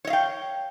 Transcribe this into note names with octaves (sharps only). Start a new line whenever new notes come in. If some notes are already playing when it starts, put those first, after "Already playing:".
C#5 D#5 F5 G5